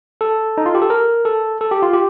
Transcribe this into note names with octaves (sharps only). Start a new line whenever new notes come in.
A4
D#4
F4
G4
A4
A#4
A4
A4
G4
F4
G4